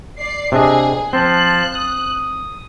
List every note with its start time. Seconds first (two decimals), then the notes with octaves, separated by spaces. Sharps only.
0.19 D5 C7
0.52 C3 D4 G#4 D#5
1.13 F3 C4 A5 C6 F#6
1.75 D#6